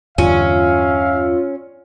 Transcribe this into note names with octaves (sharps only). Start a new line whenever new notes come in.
E2 G2 D3 C#4 F4 E5 F5